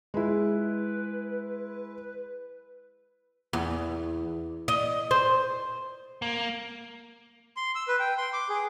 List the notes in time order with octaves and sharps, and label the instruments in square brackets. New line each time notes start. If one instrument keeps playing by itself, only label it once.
[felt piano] G#3 E4 [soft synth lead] B4
[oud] E2
D#5
C5
[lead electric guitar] A#3
[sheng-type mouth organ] C6
E6
B4
G5
C6
D6
G#4